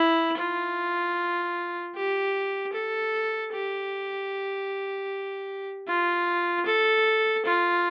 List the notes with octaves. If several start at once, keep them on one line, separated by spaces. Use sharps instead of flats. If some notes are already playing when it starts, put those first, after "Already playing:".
Already playing: E4
F4
G4
A4
G4
F4
A4
F4